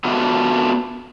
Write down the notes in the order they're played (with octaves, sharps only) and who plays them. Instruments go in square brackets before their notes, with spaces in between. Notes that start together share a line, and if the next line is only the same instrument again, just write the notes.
[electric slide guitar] A3 B3 D4 D#4 F4 F#4